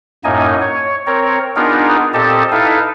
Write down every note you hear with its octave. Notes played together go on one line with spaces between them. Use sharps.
F#2 A2 A#3 D#4 D#5 G#5
C#5
C4 A#4 C#5
B3 D4 D#4 F4 G#4 A#4
A#2 C4 G4 A4 D#5 A5
D#4 E4 A4 B4 F5